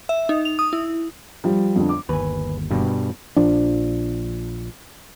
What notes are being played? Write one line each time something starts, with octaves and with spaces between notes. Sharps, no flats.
E5
D#4
F7
D#6
E4
F3 G3
F2 D3
D6
G1 D#2 B4 G#5
G2 B2 G3
A#1 F3 D4